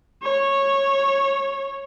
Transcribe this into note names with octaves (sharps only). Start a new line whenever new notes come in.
C#5